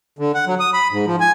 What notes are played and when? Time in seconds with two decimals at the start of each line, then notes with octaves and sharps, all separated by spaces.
0.19 D3
0.34 F#5
0.47 F#3
0.60 D#6
0.74 B5
0.91 G#2
1.06 F3
1.20 G#5